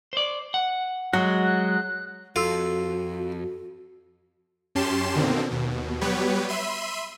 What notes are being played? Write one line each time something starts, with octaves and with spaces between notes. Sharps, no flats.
C5 D5
F#5
F#3 G#3 F#4
F#6
F2 F4 F#4 A4 E6
F#2 C#4 G4 A5 C6 E7
B2 D3 D#3 A#3 C4
D#2 B2
F#3 G3 B3 G4 B4 C#5
E5 B5 C6 D#7